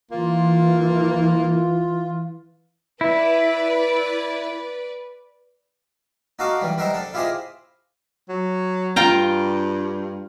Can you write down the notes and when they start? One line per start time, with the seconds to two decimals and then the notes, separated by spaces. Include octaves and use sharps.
0.12 E3 A#3 F4
3.01 E4 B4 D5
6.39 D#4 F#4 A4 F5 D6 D#6
6.61 E3 G3
6.78 G3 D#4 A#4 C5 E5 F#5
6.93 D4 A4
7.14 E4 F4 G4 G#4 C5 D#5
8.29 F#3
8.96 G2 F4 G5 A#5